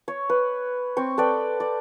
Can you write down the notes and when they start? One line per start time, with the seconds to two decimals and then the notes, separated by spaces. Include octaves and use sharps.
0.08 C#5
0.29 B4
0.97 C4 C#6
1.18 A4 B4 D5 G5
1.60 D5